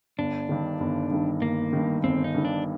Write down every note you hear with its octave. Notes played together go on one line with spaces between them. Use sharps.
G1 D4
G2 D#3
G1
G2 D#3
G1 A#3
G2 D#3
G1 C4
D#4
G2 D#3
D4